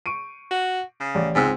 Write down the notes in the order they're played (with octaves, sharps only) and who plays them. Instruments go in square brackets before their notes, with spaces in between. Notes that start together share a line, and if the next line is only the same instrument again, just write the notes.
[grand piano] C#6 D7 D#7
[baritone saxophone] F#4
C#3
[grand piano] A1 D5
[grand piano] C#2 C4 E6 [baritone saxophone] G#2